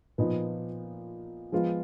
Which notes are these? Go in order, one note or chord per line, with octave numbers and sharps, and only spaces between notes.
A#2 F3 B3 D#4
F3 G#3 B3 F4